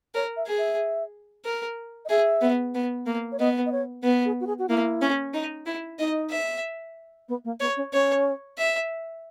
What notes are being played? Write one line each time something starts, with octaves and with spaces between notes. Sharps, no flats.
A#4 C#5
E5
G#4
E5
A#4
D#5
G#4 E5
B3
B3
A#3
C#5
B3 D#5
D#5
C#5
B3 B4
G#4
F#4
G#4
F#4
A#3 E4
C#4
D#4
E4
D#4 D#5
E5
B3
A#3
B3 C#5
C#4
C#4 C#5
E5